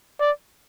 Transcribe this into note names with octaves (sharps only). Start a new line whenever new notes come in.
D5